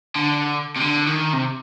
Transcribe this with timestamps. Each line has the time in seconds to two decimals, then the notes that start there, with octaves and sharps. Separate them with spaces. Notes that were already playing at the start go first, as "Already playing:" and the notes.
0.16 D3
0.76 C3
0.80 D3
1.07 D#3
1.33 C3